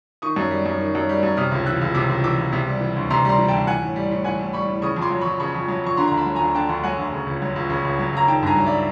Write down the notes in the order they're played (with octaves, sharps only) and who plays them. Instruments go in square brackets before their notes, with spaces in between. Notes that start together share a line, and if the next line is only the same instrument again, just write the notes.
[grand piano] D#3 C#6 D#6
F#2
G3
F#2
D#3
F#2
G3
F#2
C3 D#6 F6
C#2
E3 E6 F#6
C#2
C3 D6 E6
C#2
E3 D6 E6
C#2
C3
G3
E3
D2
C3 A#5 C6
G3 A#5 C6
E3
G5 A5
D2
E3 F#5 G#5
A2
G3
A2
E3 F#5 G#5
A2
G3 B5 C#6
A2
C#3 C#6 D#6
F2
C6 D6
F#3
F2 B5 C#6
C#3 B5 C#6
F2
F#3
F2 C#6
D3 A#5 C6
A#5
D2
A5 B5
F#3
D2 G#5 A#5
D3 G5 A5
D2
F#3 F#5 G#5
D2
C#3
C#2
F#3
C#2
C#3
C#2
F#3
C#2 A#5
D#3 G5 A5
G2 G#5 A#5
F#3
D5 E5